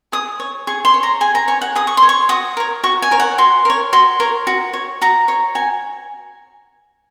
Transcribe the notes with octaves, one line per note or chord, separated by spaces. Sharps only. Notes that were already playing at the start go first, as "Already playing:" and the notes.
G#4 D#6
C#5
G#4 C#6
C6
C#5
A#5
G#4 G#5
A#5
C#5 G#5
F#5
G#4 D#6
C#6
C#5 C6
C#6
F#4 D#6
A#4 C#5
F#4 C#6
G#5
A#4 C#5
F#5
F#4 C6
A#4 C#5
F#4 C6
A#4 C#5
F#4
C#5
F#4 A#5
C#5
F#4 G#5